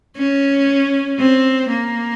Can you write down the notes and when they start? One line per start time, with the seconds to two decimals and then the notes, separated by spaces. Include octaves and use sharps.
0.17 C#4
1.19 C4
1.70 A#3